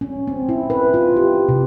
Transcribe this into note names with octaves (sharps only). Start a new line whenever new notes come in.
C#4
C4
E4
B4
F4
G4
C3